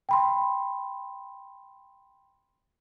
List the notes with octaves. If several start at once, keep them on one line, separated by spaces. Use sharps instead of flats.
G5 B5 C6